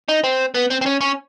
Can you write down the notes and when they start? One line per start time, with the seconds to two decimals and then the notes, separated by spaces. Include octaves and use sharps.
0.08 D#4
0.24 C4
0.54 B3
0.70 C4
0.81 C4
0.86 C#4
1.01 C#4